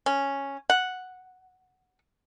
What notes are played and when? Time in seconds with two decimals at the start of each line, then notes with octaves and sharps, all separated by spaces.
0.06 C#4
0.70 F#5